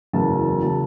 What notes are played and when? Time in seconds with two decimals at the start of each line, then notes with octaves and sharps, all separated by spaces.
0.13 F#1 E2 C#3 F#3 A5
0.63 C#3 F#3 A5